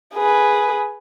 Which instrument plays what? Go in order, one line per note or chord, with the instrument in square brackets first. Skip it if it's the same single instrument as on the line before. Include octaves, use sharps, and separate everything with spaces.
[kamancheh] G#4 B4